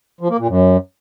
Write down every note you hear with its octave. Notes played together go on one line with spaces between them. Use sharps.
F3
A#3
A#2
F#2